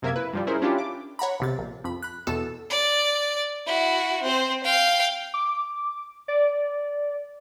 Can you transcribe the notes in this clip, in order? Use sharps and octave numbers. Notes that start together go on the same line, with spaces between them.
F#2 C3 A#3 A#4 E5 G#6
E4 B4
G2 F3 G3
C#4 E4 G#4 A#4 C5
C#4 D4 E4 F4 G4
D6
C#5 F#5 A#5 B5
B1 C3 A6
A#1
F2 B5
B5 F#6
E2 B2 A4 E7
D5
E4 F#4
C4 C5
F5 G5
D6
D5